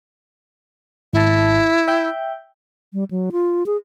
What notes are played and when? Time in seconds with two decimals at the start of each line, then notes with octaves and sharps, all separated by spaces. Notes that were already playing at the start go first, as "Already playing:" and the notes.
1.13 G#1 E4 A5
1.88 E5 G5 G6
2.93 G3
3.11 F#3
3.32 F4
3.66 G#4